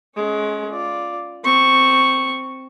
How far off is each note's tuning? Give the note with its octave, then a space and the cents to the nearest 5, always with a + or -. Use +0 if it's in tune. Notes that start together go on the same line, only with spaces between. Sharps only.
G#3 +25 C#4 +0
F4 +0 D5 +0
C4 +0 C#6 +0